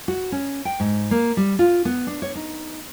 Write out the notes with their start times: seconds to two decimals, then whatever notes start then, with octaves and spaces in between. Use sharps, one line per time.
0.08 F#4
0.32 C#4
0.65 G5
0.80 G#2
1.11 A#3
1.37 G3
1.59 F4
1.85 B3
2.07 D4
2.22 C#5
2.35 D#4